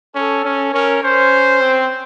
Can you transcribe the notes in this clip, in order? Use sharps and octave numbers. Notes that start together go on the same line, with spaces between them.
C#4 A4
C#4
C#4 A#4
C#4 C5
C4